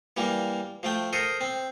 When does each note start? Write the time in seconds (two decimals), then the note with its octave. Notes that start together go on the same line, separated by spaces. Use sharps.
0.17 E3 G3 A#3
0.83 F3 A3 G5
1.13 A4 A#4 C5 D#6
1.41 C4